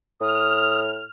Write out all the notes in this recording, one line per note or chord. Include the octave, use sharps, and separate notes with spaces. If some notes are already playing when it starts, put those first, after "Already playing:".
A2 D#6 F6